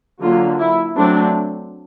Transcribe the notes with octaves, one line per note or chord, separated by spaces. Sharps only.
D3 F#3 A#3 F4
E4
F#3 A3 C4 D4